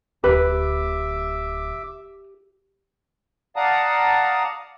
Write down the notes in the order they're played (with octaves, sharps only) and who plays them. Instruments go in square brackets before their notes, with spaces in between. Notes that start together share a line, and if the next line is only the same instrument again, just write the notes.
[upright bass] D1 D2 [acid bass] G4 [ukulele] B4 [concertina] E5 D6
[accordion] D5 F5 F#5 A5 A#5 D#6